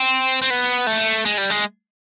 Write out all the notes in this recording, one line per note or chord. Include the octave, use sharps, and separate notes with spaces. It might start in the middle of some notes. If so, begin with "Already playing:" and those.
Already playing: C4
C4
B3
A3
G#3
G3
G#3